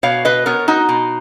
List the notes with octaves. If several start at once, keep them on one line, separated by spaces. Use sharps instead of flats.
B2 C#5 F5
B4 D#5
B3 A#4 C#5
D#4 F#4
B2